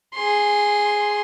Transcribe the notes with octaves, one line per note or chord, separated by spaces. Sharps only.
G#4 C6